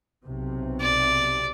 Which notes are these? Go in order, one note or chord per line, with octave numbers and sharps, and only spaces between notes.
B1 C3
D5